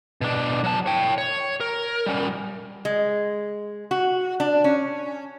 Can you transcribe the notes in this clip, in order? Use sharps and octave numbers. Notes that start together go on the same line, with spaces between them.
B2 D4
F#3 A5
C#5 G5
C#5
A#4
G3 C#4
G#3
F#4
D4
C#4